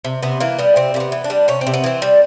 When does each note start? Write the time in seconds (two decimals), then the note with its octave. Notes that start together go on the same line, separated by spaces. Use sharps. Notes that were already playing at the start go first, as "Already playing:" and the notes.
0.05 C3
0.22 C3 B3
0.40 E3 A#3
0.58 G3 B3
0.76 C3 C4
0.94 C3 A#3
1.00 B3
1.12 E3
1.24 D4
1.30 G3
1.48 C3 C#4
1.61 C4
1.67 C3
1.74 B3
1.84 E3 C4
2.02 G3